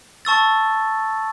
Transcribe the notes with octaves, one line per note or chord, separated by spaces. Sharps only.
A5 C#6 E6 A6